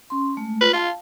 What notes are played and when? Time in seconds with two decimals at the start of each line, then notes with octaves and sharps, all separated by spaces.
0.10 C#4 C6
0.37 G#3 A3
0.61 F4 B4
0.73 F4 F5 A5